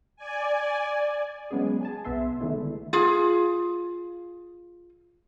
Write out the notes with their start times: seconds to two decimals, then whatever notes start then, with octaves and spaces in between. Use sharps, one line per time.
0.16 D5 G#5
1.51 F#3 G#3 B3 C#4 G#4
1.81 G#4 G#5 A5
2.04 B1 B3 E5 C6
2.41 D3 D#3 G#3 A3 B3 E4
2.93 F4 G#4